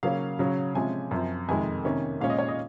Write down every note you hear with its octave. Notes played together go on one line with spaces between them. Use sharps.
C#3 F#3 A#3 C#4 F5
C#3 F#3 C#4
C3 F3 G#3 C#4 G#5
F#2 F3 C4
F2 C3 D#3 G#3 G#5
C3 D#3 A#3 C#4
A#2 G#3 C#4 F5
D#5
C#5
D#5